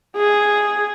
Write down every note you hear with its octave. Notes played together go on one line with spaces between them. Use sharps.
G#4